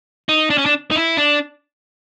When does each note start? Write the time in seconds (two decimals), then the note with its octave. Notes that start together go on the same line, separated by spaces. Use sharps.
0.29 D#4
0.50 D4
0.58 C#4
0.66 D4
0.91 D#4
0.96 E4
1.17 D4